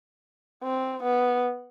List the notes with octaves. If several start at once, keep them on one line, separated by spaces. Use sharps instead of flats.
C4
B3